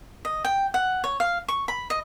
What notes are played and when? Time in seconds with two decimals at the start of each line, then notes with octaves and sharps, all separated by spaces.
0.25 D#5
0.45 G5
0.74 F#5
1.04 C#5
1.20 F5
1.48 C#6
1.68 B5
1.90 D#5